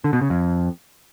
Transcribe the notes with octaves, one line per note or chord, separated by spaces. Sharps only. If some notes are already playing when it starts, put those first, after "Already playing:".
D3
B2
C#3
F2